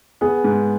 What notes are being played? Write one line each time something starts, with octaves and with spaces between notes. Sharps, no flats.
B3 G#4
G#2